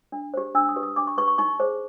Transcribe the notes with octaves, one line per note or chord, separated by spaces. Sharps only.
D4
G4 C5
D4 E6
D#6
G4 B4
D#6
D4 D6
C#6
G4 B4 C#6
C#6
D#4 C#6
G#4 C5